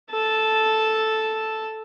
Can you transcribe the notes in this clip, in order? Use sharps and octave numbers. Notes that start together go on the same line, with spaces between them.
A4 A5